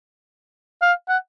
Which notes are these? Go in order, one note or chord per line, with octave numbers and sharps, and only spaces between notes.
F5
F#5